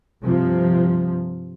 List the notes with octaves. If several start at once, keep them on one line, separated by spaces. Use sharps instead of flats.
G2 C3 F3